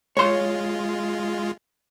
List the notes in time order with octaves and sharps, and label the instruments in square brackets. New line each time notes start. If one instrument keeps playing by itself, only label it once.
[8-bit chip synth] G#3 F4 [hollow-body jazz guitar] C#5 C6